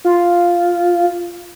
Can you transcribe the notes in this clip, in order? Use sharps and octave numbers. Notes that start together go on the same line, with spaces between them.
F4